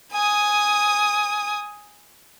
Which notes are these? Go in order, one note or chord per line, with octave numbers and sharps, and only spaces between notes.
G#5 D#6